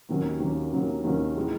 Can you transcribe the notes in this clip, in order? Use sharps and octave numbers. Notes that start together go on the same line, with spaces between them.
D#2 D#3 F#3 A#3 C#4
D#2 D#3 F#3 A#3 C#4
D#2 D#3 F#3 A#3 C#4
D#2 D#3 F#3 A#3 C#4
E3 G#3